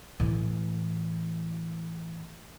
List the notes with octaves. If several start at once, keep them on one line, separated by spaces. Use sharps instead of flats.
A2 E3